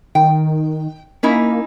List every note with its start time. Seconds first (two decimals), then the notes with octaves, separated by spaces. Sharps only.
0.15 D#3 G5
1.23 A#3 C#4 D#4 E4